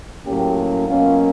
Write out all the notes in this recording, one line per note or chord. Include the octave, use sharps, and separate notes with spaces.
A2 F#3 A#3 C#4 G4
B2 F#3 A#3 C#4 F4